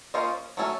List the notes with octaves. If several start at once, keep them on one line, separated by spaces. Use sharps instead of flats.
A#3 C#4 F4 C5 D#5
F#3 A3 C#4 A4